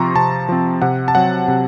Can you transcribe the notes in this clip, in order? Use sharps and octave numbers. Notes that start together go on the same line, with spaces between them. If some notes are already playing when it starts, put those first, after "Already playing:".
Already playing: C3 F3 C4 A#5 C6 C#6
C3 A5
F3 C4
C3 F#5
A5
F#3 C4 F#5
C3